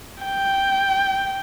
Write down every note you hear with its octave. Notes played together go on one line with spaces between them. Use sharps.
G5